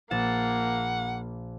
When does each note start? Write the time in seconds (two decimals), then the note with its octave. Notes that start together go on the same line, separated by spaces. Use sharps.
0.11 A#1 A#3 F#5 A6 E7